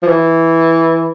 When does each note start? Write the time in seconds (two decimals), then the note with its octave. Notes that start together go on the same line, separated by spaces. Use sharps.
0.03 F3
0.07 E3